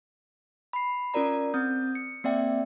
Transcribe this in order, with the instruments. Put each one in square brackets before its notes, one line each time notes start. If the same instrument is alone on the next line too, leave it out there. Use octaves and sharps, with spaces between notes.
[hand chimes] B5 C7
C#4 F4 A#4 D5 A#5
C4 D#6 G6
C#7
A#3 C4 D5 E5 G5